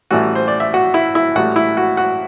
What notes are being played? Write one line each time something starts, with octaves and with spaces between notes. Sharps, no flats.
A1 A2 E3 G3 F#4 F#5
C5
D5
E5
F#4 F#5
E4 E5
E4 E5
A1 A2 G3 F#4 F#5
E4 E5
F#4 F#5
F#4 F#5